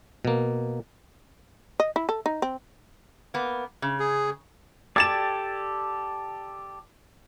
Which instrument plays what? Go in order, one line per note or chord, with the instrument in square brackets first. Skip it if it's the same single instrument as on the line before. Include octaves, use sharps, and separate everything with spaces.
[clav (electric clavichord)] B2 A#3
[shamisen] D#5
E4
A4
D#4
C4
[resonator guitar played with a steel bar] A#3 B3
C#3
[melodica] G#4
[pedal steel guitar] G4 A4 D5 [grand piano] G#6 A6 E7